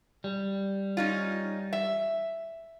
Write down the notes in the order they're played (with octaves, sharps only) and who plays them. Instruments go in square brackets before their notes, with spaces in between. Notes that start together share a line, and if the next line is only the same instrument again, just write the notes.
[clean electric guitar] G3
[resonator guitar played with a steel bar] C#4 D#4 F4
E5